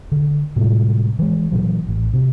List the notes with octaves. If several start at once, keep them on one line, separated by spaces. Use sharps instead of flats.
D3
A2 C3 G3 G#3
E3 G#3
A#2 E3 F#3
A1
C3